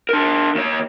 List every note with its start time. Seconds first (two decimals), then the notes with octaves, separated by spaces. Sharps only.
0.09 D4 A#4
0.55 D#2 C#5